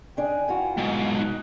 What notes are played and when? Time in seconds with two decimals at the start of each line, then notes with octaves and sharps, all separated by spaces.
0.17 C#3 D4 D#4 G5 G#5
0.48 E3 F4 F#4
0.78 G#2 B2 D#5
1.16 D#4 D#5 F#6